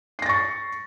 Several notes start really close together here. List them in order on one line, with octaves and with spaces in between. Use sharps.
C7 A#6 A6 C#6